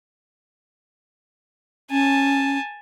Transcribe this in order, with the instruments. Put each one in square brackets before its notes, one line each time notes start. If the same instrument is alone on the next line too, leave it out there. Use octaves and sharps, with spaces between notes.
[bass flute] C#4 [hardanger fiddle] G#5 A5